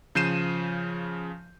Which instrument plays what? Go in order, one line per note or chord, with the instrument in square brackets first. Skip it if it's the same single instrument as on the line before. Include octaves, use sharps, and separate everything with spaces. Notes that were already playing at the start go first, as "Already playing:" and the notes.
[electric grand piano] C#3 F3 G6 C7 D#7 E7